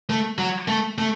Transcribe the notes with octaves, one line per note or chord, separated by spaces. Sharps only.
A3
F#3
A3
A3